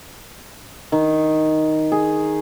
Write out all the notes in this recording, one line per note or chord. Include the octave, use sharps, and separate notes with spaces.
D#3
G#4